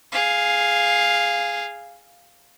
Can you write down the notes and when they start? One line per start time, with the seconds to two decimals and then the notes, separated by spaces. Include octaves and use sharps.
0.12 G#4 F5